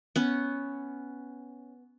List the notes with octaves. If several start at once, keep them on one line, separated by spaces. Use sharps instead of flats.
B3 C#4